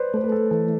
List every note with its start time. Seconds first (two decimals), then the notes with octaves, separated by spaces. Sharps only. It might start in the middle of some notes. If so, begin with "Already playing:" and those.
Already playing: B4 C5 D5
0.14 A3 C5
0.24 B4
0.32 A4
0.51 E3 A4